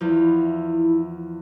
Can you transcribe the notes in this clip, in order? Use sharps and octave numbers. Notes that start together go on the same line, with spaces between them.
E2 F3 E4